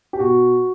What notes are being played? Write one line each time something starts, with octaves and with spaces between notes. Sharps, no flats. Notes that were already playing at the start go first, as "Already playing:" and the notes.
G4
B2 F#4